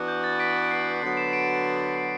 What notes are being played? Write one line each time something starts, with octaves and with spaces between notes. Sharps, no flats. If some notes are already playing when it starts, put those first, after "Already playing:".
Already playing: E3 B3 D4 F#4
G6
A6
B6 D7
D7
C7
D3 F#3 B3 F#4 C7
D7
C7 E7
B6 D7
C7
C7
C7